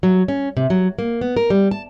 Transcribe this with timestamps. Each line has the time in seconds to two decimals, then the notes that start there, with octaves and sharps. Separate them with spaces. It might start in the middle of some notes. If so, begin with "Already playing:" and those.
0.03 F#3
0.28 C#4
0.57 C3
0.70 F#3
0.99 A#3
1.21 B3
1.37 A#4
1.50 G3
1.71 A5